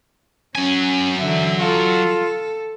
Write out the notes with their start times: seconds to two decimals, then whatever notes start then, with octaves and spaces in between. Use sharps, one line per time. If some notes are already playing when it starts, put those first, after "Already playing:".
0.55 F#3 C#4 G#5
1.20 D3 E3 E5
1.60 F4 A4